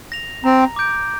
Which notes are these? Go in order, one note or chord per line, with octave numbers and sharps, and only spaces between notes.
A#6 F7
C4 A#5
D6 G6 D7